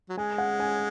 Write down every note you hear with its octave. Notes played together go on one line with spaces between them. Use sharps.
F#3
G#3 G#5
F#5
G#5